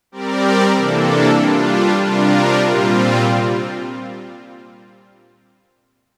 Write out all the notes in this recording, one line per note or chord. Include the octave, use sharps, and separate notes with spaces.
G3 C4 G4 A#4 D5
C3 E3 A#3 D4 A4
G3 D4 F4
C3 G3 D4 F4 A#4
A#2 G3 C4 F4